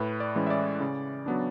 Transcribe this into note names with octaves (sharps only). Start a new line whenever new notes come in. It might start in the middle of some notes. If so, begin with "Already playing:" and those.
Already playing: A2 B4
D5
E3 G#3 C#4
E5
D5
C#3
F#3 B3 D4